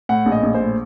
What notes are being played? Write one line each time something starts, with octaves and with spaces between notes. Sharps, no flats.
A2 F#5
A#1
D#5
A#1
C5
A2